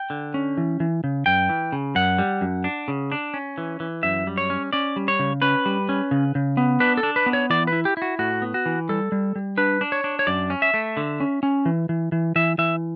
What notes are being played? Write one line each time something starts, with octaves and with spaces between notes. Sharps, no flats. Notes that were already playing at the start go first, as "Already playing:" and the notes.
Already playing: G5
D3
C#4
E3
E3
C#3
F#2 G5
E3
C#3
F#2 F#5
G3
F#2
D4
C#3
D4
C#4
E3
E3
F#2 E5
G3
C#5
C#4
C#4 D5
G3
C#5
C#3
C#4 B4
G3
C#4
C#3
C#3
B3
D4 B4
A4
D4
B4
B3
C#5
E3 D5
B4
E4
G4
E4 F#4
A2 F#4
B3
F#4
E3
G3 A4
G3
G3
D4 B4
D4
C#5
D4
C#5
F#2 D5
C#4
E5
A3
D3
C#4
C#4
E3
E3
E3
E3 E5
E3 E5